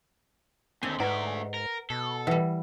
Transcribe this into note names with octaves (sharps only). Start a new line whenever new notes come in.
D#2 D3 C4 G#5
G#2 A3 B4 D5 F#5 A#5
A#4
B2 A4
E3 G3 A#4 B4 F#5